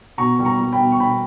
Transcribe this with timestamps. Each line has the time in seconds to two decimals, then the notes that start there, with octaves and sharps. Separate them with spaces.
0.18 B2 A#5 C#6
0.39 G3
0.45 A#5 C#6
0.59 G3
0.73 G5 B5
0.80 B2
0.92 C#6
1.00 B2 G5 B5